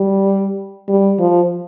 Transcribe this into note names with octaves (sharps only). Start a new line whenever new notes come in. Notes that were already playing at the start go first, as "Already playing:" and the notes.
Already playing: G3
G3
F3